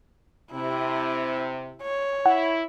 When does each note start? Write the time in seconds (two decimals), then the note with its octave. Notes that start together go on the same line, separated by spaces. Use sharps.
0.52 C3 E4
1.82 C#5
2.26 E4 F#5